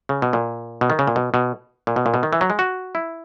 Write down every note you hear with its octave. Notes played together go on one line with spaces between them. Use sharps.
C#3
B2
A#2
B2
D#3
C#3
A#2
B2
B2
A#2
B2
A#2
B2
D#3
E3
F#3
G#3
F#4
E4